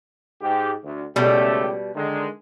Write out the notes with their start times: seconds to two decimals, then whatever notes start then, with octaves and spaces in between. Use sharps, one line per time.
0.41 G#2 G4
0.84 D2
1.16 C#2 B2 G3 A3 G4
1.94 D3 D#3 G#3